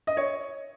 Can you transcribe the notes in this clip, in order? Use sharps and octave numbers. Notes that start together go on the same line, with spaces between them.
D#5
C#5